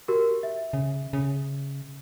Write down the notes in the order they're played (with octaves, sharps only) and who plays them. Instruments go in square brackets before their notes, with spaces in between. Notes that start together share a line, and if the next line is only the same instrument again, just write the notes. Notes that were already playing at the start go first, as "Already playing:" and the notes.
[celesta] F#4 G4 A#4
E5
[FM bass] C#3
C#3